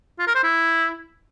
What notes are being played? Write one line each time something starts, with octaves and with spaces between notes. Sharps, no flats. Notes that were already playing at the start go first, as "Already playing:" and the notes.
F4
A#4
C5
E4